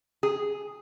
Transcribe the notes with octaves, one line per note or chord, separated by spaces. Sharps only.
G#4